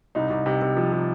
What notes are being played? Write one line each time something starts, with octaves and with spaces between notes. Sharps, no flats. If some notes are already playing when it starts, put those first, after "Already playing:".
C2 D#4
C2
C3
C3
F3
C3